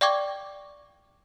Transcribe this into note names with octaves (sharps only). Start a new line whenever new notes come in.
D5 F5 G5 C#6 D6 G#6